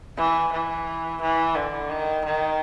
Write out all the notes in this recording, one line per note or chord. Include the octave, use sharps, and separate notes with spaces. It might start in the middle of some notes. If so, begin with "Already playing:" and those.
E3
E3
E3
D3
D#3
D#3